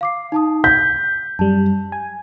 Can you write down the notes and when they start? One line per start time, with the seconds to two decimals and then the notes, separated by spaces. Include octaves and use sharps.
0.01 F5 D6 C7
0.32 D#4 A5 D#6
0.64 G6 A#6 B6
1.39 F#2 G3 A5
1.92 G#5